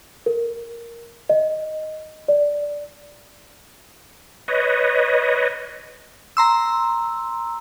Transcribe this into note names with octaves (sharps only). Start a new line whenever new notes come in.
A#4
D#5
D5
B4 C#5 D#5
A#5 C6 E6